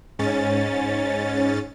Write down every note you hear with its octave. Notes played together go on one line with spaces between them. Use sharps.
G#2 C#4 A6